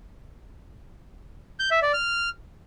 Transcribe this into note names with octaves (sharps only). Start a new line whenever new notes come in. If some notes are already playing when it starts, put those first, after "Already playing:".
G6
E5
D5
F6